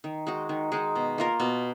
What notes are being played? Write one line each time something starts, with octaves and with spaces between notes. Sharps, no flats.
D#3
G#3 D#4 F#4
D#3
G#3 D#4 F#4
B2
A#3 F4 A#4
B2